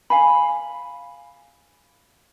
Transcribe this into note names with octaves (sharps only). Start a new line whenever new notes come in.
F5 G#5 B5